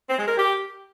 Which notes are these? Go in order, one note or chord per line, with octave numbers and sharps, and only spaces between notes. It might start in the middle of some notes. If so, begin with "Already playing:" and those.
C4
G#3
A#4
G4